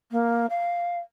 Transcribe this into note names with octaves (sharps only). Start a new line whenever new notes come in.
A#3
F5